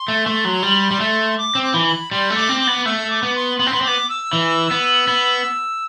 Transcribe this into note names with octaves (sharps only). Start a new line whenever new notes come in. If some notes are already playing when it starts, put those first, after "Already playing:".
Already playing: C6
A3
A3
F#3
G3
G3
A3
D6
C4
D6
E3
B5
G3 C6
A3
D6
C4
D6
B3
A3 E6
D6
B3
C6
B3 C6
C4
B3
C4
B3 D6
E6
E3
B3
B3